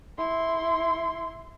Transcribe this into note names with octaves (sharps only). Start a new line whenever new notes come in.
E4 C6